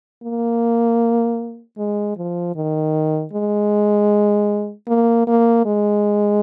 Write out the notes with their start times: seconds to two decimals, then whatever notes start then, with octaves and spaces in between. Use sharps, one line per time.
0.23 A#3
1.78 G#3
2.17 F3
2.56 D#3
3.33 G#3
4.88 A#3
5.27 A#3
5.66 G#3